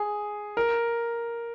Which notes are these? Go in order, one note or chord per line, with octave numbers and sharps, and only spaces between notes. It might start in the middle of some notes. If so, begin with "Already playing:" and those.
Already playing: G#4
A#4